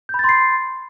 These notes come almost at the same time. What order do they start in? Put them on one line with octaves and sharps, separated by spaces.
G6 B5 A6 C6 C7